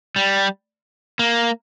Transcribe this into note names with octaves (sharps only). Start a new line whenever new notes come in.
G3
A#3